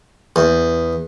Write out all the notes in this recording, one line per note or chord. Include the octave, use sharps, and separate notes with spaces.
E2